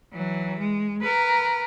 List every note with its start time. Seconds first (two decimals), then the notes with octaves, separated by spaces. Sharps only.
0.13 E3 F#3
0.59 G#3
1.01 A#4 B4